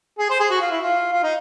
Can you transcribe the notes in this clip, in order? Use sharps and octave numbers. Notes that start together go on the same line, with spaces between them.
G#4
C5
G#4
F#4
F4
E4
F4
F4
D#4